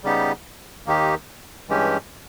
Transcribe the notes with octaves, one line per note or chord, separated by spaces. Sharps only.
C#3 G3 B3 D#4 G4
D#2 D#3 A#3 D#4 G4
G2 E3 G#3 C#4 G4